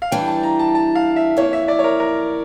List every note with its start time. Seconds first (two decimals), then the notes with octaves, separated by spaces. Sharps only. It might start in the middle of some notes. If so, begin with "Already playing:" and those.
0.02 F5
0.12 E3 G3 D4 G5
0.28 A5
0.43 A#5
0.59 A5
0.75 A5
0.95 F5
1.16 E5
1.37 F2 E3 A#3 C#5
1.53 E5
1.68 D5
1.79 C#5
1.84 A#4
2.00 A#4